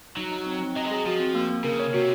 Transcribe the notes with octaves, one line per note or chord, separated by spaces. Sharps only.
F#3 D#4
D#4
C4
C4
F#3 D#5
G#3
F#3 G#4
F3 F#4
C4
A#3
A#3
C#3 A#4
C#5
C3 F#4